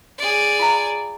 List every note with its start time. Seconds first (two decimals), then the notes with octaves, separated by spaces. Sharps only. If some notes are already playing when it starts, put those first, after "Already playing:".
0.18 G#4 D5
0.59 F4 F5 A#5